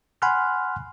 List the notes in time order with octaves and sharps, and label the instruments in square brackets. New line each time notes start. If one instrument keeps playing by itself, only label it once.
[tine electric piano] F#5 G#5 B5 C6 F6 F#6